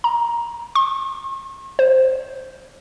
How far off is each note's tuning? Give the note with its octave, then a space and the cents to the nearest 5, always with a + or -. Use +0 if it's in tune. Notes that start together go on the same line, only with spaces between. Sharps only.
A#5 +15
C#6 -45
C5 +0